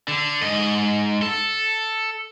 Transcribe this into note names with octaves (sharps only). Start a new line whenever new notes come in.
D3
G#2 D#5
A4